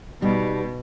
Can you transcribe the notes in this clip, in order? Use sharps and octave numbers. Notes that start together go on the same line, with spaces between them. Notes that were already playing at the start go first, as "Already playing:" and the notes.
B2 G3 B3 D#4